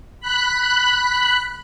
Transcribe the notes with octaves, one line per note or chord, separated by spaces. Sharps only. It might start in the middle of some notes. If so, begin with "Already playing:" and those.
B5 F#6